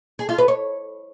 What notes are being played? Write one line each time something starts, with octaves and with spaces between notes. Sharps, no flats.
G#4
F4
B4
C#5